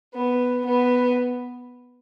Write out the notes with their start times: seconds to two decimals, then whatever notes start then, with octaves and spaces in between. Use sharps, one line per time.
0.14 B3
0.65 B3